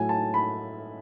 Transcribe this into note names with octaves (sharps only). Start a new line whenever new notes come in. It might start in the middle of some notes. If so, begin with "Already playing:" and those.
Already playing: A2 F#3 A3 G#5
A5
B5